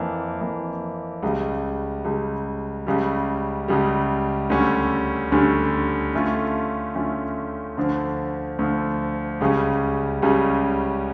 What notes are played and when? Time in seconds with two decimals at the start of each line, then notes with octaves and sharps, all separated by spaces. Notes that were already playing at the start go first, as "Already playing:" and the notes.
Already playing: F2 E3 A#3
0.41 F2 E3 A#3
1.23 C#2 C#3 G3
2.05 C#2 C#3 G3
2.87 C#2 C#3 G3
3.68 C#2 C#3 G3
4.50 D2 D3 G3 C#4
5.32 D2 D3 G3 C#4
6.13 D3 A3 C#4 F4
6.95 D3 A3 C#4 F4
7.77 D2 D3 F3
8.59 D2 D3 F3
9.41 C#2 C#3 G3 C#4
10.22 C#2 C#3 G3 C#4